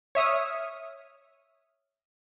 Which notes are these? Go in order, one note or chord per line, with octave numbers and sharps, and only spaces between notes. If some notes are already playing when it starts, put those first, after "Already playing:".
C#5 E5 D#6 F6